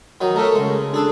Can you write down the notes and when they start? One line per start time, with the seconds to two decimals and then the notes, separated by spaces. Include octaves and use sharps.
0.21 D#3 F#3 D#4
0.36 A3 C#4 A#4
0.55 C#3 G#3
0.94 D4 G#4 A4